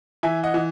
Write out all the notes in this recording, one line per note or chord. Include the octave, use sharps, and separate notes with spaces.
E3 E5 G#5
D#5 F#5
E3